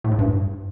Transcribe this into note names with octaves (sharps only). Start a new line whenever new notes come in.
A2
G#2
G2